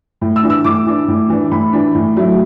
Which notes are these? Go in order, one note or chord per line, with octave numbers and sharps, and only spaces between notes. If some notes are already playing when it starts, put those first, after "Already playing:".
A2
E6
E3 D4
E6
A2 D6
E3 D4
A2
E3 D4
A2 B5
E3 D4
A2
F#3 A3 E4